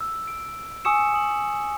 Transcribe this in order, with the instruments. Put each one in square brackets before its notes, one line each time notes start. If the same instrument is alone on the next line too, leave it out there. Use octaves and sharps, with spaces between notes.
[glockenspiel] E6
D7
G#5 C#6 D#6 E6 C#7 E7
C#6 D#6 F#7